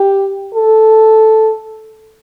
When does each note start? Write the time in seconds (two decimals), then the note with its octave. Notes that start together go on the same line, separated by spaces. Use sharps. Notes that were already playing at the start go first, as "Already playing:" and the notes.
Already playing: G4
0.55 A4